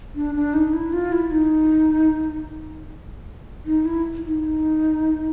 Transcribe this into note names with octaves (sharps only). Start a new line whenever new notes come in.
D4
D4
D#4
E4
F4
E4
D#4
D#4
E4
E4
D#4